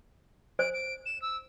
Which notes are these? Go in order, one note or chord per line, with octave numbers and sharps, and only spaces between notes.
C5 D7
D7
E7
E6